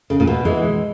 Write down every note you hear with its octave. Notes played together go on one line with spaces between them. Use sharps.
C#3
A#2
B2
E3 G#3